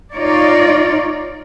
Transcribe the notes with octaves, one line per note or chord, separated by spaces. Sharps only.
D#4 F4 C#5 D5